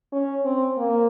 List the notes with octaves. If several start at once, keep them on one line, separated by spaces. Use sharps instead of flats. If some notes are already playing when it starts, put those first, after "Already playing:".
C#4
C4
A#3